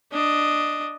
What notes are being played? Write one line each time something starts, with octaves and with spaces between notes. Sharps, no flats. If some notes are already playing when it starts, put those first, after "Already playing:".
D4 D#5